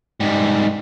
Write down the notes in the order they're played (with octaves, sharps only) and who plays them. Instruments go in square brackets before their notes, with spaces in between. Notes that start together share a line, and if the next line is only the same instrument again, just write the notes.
[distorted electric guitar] G#2 G3